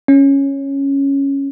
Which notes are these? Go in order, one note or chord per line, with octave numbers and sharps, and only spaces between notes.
C#4